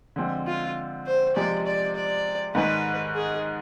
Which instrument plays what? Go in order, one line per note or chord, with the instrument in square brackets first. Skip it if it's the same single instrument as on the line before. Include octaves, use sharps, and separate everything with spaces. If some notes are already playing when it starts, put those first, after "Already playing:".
[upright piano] D3 F3 G#3 C4
[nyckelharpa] F4
C5
[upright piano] C3 F3 G#3 [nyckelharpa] D5
[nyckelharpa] D5
D5
[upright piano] G#2 D#3 G#3 [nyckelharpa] B4
[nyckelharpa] G#4